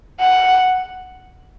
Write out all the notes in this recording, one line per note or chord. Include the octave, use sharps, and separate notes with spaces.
F#5